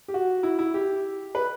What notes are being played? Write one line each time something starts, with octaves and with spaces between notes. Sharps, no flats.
G4
F#4
E4
E4
G4
B4